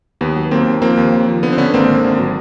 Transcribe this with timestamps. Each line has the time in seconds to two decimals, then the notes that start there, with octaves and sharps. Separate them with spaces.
0.21 D#2 B3
0.36 F#3
0.51 D#2 A#3 C4
0.67 D#2
0.82 F3 A#3 C4
0.97 D#2
1.12 D#2
1.28 F3
1.43 D3 B3
1.52 C4
1.58 D3 B3 C#4
1.74 G#1 A#3 C4
1.89 D3
2.04 G#1
2.19 F#3